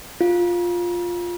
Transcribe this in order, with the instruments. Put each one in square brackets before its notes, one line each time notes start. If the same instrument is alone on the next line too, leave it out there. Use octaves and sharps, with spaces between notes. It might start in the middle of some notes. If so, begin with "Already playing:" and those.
[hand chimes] F4